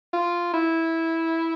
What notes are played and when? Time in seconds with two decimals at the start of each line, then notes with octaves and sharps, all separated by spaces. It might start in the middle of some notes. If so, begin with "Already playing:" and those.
0.13 F4
0.54 E4